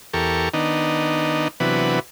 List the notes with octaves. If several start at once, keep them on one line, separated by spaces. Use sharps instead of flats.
E2 G4 A4 A#4 C#6
D#3 B3 D4 D#4
C3 E3 F#3 B3 D4 B4